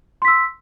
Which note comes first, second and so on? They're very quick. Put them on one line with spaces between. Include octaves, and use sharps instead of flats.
C6 B6 E6